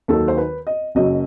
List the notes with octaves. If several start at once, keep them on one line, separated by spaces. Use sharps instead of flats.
D#2 D#3 F#3 A4
C5
B4
D#5
F#1 F#2 F#3 D#5